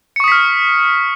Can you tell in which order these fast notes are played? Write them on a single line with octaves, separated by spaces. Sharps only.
C#7 C#6 D#6 B6 F6